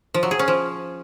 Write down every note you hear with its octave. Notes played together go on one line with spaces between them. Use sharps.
F3
F#3
G#4
C#4
F3